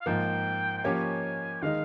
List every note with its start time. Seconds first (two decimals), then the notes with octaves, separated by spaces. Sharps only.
0.01 F5
0.06 G#2 F3 A#3 G5
0.78 G5
0.84 F3 A#3 C#4 G4 C#5 G#5
1.62 D#3 G#3 D#4 F5